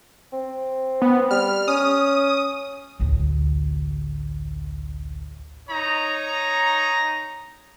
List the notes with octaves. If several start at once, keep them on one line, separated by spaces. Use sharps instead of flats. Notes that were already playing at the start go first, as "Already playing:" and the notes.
C4
B3
G3 F6
C#4 D#6
A1 D2
D#4 C#5 A#5